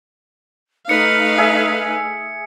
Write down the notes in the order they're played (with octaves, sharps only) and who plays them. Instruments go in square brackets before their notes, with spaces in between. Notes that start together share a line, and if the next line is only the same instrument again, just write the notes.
[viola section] A3 D#4 F5 [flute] B4 [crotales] C#7
[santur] G#4 E5